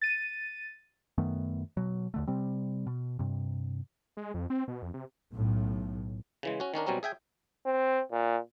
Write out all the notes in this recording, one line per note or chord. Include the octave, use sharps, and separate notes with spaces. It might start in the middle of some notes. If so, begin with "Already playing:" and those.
A6 D#7
F#2 D#3 A3 B3
B2 F#3
D#2 D3 A3
C3 G3 C4
B2
G2 C3
G#3
F2
C4
B2
F2
C3
B1 A2
C#3 E3 G#3
C#4 F#4
D#3 C#4 D4 A#4
B2 F#3 G3 C4 C#4 A#4
G#4 E5 G5 G#5
C4
A#2